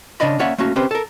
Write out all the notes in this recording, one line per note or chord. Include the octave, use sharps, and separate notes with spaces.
C#3 D4 D5 D#5 B5
A#3 C#4 C#5 D5 E5 F#5
A3 A#3 C#4 F#4
C4 C#4 G4 B4 C5
A4 A#4